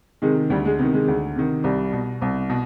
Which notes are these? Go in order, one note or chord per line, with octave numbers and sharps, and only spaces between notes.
C3 D#3 G#3
D2 G3
G#3
C3 D#3 B3
G#3
D2
C3 D#3
C2 G3
B2
C2
B2